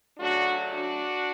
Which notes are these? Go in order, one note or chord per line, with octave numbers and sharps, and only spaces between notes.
C#3 F#3 A3 D4 F#4
D4 F#4